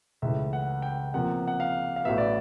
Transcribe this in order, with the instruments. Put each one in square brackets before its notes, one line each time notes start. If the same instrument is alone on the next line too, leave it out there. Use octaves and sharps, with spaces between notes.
[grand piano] C#2 C#3 E3 A3 E5
F#5
G5
E2 C3 F3 A#3 F#5
F#5
F5
F5
A1 A2 F#3 B3 E5
D5